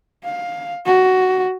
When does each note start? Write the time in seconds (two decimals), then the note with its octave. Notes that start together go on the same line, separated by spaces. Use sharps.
0.24 F5
0.86 F#4